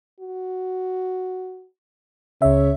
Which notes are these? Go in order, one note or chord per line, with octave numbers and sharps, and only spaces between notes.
F#4
C#2 C#3 C#5 E5